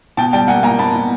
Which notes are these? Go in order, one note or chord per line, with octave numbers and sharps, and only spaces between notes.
B2 G5 A5
G3 G5 A5
A#3 F#5 G#5
A#3 G#5 A#5
B2 A5 B5
B2